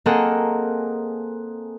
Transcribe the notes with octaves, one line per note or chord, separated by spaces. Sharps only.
A#3 C4 G#4 A4 D#5 F#5